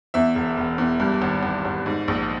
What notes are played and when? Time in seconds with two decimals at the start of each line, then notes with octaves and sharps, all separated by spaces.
0.14 E2 E5
0.35 E1
0.57 E1
0.78 E2
1.00 G2
1.22 G#1
1.43 G#1
1.65 G#1
1.86 G#2
2.08 A#1